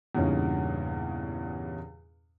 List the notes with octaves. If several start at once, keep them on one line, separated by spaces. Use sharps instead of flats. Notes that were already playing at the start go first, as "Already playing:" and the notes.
E2 G2 A#2 C#3 C#4 D#4